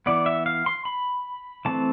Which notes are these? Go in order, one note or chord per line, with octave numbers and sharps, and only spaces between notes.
E3 B3 D5
E5
F5
C6
B5
E3 A3 C4 A5